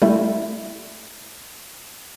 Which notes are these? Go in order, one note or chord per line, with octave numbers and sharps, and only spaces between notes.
G3 A3 E4